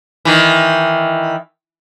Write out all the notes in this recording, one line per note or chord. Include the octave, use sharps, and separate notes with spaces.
D#3 E3